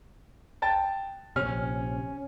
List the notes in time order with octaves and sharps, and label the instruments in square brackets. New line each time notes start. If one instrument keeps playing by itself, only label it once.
[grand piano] G5 A5 A6
[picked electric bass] A#1 C3 [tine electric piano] C#4 [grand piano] F6